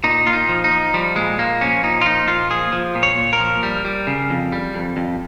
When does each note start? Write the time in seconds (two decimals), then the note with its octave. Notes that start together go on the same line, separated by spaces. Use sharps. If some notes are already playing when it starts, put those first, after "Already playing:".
0.04 A#2 D#4
0.26 A#2 F4
0.33 D#4
0.49 F3
0.64 D#4
0.71 F3
0.94 F3 G3
1.16 A#2 G#3
1.38 A#2 A#3
1.61 F3 C#4
1.83 A#2 D#4
2.01 F4
2.05 F3 D#4
2.28 A#2 F4
2.50 F3 G#4
2.73 F3
2.95 A#2
3.03 C#5
3.18 A#2
3.33 A#4
3.40 F3
3.63 G3
3.85 G3
4.07 C#3
4.30 F2
4.52 G3
4.75 F2
4.97 F2